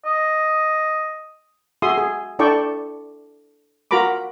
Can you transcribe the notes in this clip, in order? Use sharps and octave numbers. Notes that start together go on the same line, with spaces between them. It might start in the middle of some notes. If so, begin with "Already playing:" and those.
D#5
F#4 G#4 E5 C6 D#6
G#4
D4 E4 A4 D5 G5 C#6
F4 F#4 A#4 A#5 B5 D6